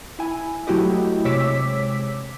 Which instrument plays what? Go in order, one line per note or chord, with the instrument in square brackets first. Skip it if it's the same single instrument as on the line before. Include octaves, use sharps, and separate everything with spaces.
[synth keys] E4 G#5
F#3 A3 E4 F#4 G4 D#5
C3 G#3 C#5 D6 E6 B6